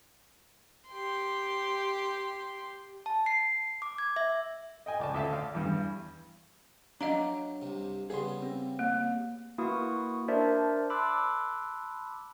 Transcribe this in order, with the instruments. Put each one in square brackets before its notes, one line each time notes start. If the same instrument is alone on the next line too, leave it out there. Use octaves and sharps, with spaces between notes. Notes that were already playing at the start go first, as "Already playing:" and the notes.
[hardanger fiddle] G4 C6
[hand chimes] A5
C7
D6
G#6
E5
[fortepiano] D#5 G5 G#5
C#2 D5 A5
D2 A4 E5 F5 A5
D5 F5
E2 G2
[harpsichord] F#3 [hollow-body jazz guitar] D4 [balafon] D#5 F5 A#5
[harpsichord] C2 C3
[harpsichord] C#3 G3 B3 [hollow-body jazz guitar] G#4 C6
[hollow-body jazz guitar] C4
[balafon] A#3
[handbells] A#3 E4 F#4 B4 C#6 D#6
D4 A#4 C5 D5 E5 A5
A5 B5 C6 D6 E6 F#6